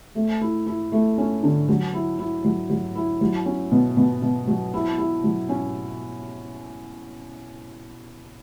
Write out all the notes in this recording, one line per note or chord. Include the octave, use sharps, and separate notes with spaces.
A3
E4
E4
A3
C#4
D3
F#3
E4
E4
F#3
F#3
E4
F#3
C#4
B2
B2
B2
F#3
E4
E4
F#3
C#4